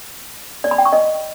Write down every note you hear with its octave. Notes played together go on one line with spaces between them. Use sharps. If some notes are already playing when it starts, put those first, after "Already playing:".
D5
B5
G5
C#6
D#5